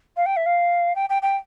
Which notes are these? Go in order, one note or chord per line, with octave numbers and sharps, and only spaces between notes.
F5
G5
E5
F5
G5
G5
G5